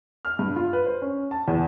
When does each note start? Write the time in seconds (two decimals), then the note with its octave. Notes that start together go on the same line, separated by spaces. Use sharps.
0.25 F6
0.39 G2
0.56 F4
0.73 B4
0.86 C5
1.02 C#4
1.31 A5
1.48 E2